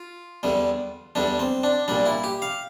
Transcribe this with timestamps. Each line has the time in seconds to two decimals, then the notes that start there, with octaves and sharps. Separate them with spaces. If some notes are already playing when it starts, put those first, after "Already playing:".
Already playing: F4
0.43 E2 D3 G3
1.15 E2 D3 G3 D4
1.39 C4
1.63 D4
1.88 A#1 A#2 G3 D4
2.06 E4
2.24 G4
2.42 F5